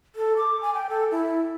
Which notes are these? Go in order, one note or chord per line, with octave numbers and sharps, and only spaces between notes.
A4
D6
G#5
G5
A4
E4